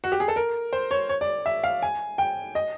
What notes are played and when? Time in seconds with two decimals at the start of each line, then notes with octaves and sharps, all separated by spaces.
0.04 F#4
0.12 G4
0.20 G#4
0.28 A4
0.36 A#4
0.73 C5
0.91 C#5
1.09 C#5
1.21 D5
1.46 E5
1.64 F5
1.82 G#5
2.18 G5
2.55 D#5